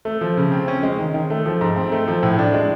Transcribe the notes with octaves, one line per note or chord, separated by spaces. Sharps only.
A3
F3
C#3
C4
C#4
G#3
D#3
D#3
A3
F3
G#2
C4
A3
F3
A2
D4
G#3